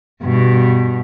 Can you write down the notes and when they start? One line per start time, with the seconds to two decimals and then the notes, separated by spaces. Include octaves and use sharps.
0.23 G2 B2